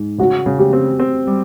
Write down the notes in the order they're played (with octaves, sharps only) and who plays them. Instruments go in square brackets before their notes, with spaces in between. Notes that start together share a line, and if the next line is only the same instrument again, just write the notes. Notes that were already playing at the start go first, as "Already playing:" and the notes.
Already playing: [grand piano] G#2
[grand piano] C#3 [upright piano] F#4
[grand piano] C#3
[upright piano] G4
[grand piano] C4
C4
G3